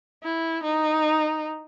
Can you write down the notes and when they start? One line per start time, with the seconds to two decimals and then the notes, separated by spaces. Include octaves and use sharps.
0.23 E4
0.63 D#4